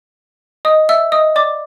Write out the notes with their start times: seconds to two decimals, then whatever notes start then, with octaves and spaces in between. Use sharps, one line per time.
0.65 D#5 D#6
0.89 E5 E6
1.12 D#5 D#6
1.36 D5 D6